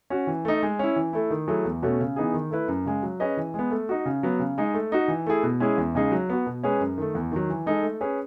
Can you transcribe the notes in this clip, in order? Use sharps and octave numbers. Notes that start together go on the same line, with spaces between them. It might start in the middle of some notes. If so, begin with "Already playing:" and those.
C#4 F#4
E3
A3 D#4
G#3
C#4 E4
E3
A3 E4
D#3
F#3 A3 E4 G#4
E2
B2 A3 C#4 F#4
C#3
E3 B3 D#4 G#4
D#3
A3 E4 B4
F#2
C#3 G#3
F#3
C#4 G#4 B4 D#5
E3
G#3 B3
A3
D#4 F#4
C#3
F#3 B3
C#3
G#3 D#4
A3
D#4 F#4
E3
A3 E4 G#4
B2
G#3 C#4 E4 G#4
E2
C#3 G#3 D#4 G#4
F#3
B3 F#4
B2
G#3 C#4 G#4 B4
F#2
D#3 A3
E2
D#3 F#3
E3
G#3 D#4 A4
A3
C#4 G#4 B4